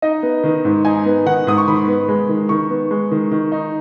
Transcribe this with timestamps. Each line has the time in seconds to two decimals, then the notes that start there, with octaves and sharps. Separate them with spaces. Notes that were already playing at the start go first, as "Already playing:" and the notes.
0.02 D#4 D#5
0.23 B3
0.44 D#3
0.65 G#2
0.85 D#4 G#5
1.06 B3
1.26 D#3 F#5
1.47 G#2 D#6
1.58 C#6
1.68 D#3 B5
1.88 B3
2.08 G#3
2.29 D#3
2.49 D#3 C#6
2.70 B3
2.91 G#3
3.11 D#3
3.31 D#3
3.52 D#4